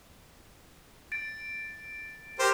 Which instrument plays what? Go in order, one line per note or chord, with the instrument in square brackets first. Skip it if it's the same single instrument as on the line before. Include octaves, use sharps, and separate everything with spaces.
[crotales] A6 D7
[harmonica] G4 A#4 C5